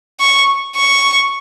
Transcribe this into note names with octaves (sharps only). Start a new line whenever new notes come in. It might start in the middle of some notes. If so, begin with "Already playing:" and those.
C#6
C#6